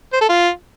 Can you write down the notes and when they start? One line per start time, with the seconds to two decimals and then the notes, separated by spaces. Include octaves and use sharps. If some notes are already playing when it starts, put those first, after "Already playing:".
0.13 C5
0.21 A4
0.29 F4